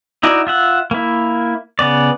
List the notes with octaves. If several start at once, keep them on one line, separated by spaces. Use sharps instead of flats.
D#4 E4 F#4 D5
F4 E5 F#5
A#3 E4
C#3 B3 D5